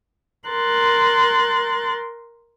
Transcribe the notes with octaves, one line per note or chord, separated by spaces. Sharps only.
A#4 C6 F#6 A6